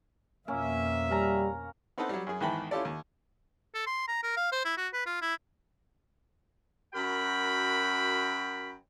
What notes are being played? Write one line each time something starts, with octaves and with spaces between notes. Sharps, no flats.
F2 B2 A#3 C#4 E5
G3 C#4 F5 A#5
B3 C4 D#4 A4 B4 F#5
F#3 G3
F#2 G#4
E2 G#2 D#3 G5 A5 B5
C#4 E4 F4 G4 A4 D5
D#2
A4
C6
A#5
A#4
F5
C5
E4
F#4
B4
F4
E4
F#2 F#4 A#4 G5 B5